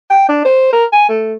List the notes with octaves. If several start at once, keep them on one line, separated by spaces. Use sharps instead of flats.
G5
D4
C5
A#4
G#5
A3